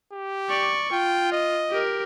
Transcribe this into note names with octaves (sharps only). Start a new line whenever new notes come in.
G4
D5 C#6
F4 G5
D#5
G4 A#4